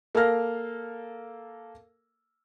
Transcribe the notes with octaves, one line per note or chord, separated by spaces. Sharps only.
A#3 A4 F5 F6 A#6